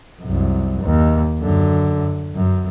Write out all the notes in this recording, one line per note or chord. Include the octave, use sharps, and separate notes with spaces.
C2 F#2
D#2
F#2 D3
F#2